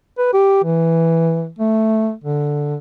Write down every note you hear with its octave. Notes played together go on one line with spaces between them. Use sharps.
B4
G4
E3
A3
D3